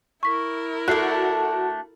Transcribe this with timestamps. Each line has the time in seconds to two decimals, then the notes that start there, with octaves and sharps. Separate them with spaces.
0.23 E4 A#4 C#6 B6
0.88 A3 D4 F#4 A4 F#6 C7